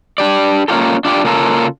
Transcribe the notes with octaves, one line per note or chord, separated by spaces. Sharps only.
D4 G4 D5
A#3 C#4 D#4 F4 G4 A4
D4 F4 G4 D5
C#3 A#3 C#4 F4 A4 A#4